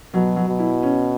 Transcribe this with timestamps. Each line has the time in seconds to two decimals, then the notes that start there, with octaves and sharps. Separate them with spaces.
0.14 B2 F#3
0.36 F#3
0.48 B2
0.59 E4
0.83 C#4